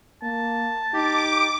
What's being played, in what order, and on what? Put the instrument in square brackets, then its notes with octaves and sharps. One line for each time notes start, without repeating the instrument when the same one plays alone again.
[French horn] A#3 [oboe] A5
[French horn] D#4 [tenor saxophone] G4 [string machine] D6